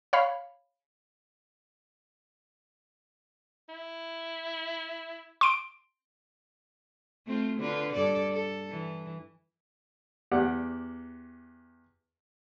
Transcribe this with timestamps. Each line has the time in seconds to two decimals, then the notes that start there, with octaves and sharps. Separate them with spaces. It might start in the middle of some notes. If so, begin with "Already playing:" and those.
0.13 C#5 F5 B5
3.69 E4
5.41 C6 D7
7.27 A3 C4 F4
7.59 D3 F4 B4
7.93 G2 A4 D5
8.32 A4
8.70 E3
10.31 E2 G4 D5 F#5